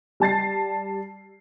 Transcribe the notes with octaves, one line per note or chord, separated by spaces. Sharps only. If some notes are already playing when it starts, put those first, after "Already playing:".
G3 A5 A6 C7